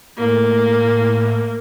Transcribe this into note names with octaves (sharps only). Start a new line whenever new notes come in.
A2 A#3